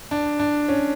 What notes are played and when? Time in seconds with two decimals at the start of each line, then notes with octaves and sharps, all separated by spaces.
0.11 D4
0.39 D4
0.69 C#4